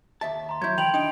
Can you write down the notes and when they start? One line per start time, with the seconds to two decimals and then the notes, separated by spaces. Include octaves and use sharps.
0.21 D#2 E5 A5
0.49 A#5 C6
0.62 F#3 E4 G6 G#6
0.78 D#3 E3 G5 B5 F7 F#7
0.94 D4 D#4 G5